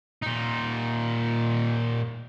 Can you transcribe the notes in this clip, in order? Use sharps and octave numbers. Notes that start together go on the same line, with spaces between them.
A#2 D#4